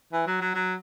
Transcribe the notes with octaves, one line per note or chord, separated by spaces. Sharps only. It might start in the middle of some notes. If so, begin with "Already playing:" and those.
E3
F#3
F#3
F#3